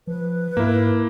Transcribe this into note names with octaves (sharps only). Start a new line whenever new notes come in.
F3 B4
G#2 A#3 E4